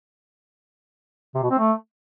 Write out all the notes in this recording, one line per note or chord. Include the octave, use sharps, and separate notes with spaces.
C3
B2
C4
A3